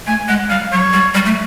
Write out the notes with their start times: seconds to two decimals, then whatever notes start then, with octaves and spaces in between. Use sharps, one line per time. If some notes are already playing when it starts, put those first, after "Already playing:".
0.07 A3 G#5
0.28 G#3 F#5
0.50 G3 F5
0.72 F#3 C#5
0.93 G3
1.15 G3
1.26 A3